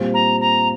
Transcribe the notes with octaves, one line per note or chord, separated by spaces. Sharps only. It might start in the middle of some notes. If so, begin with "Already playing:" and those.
Already playing: A#2 G3 C4
A#5
A#5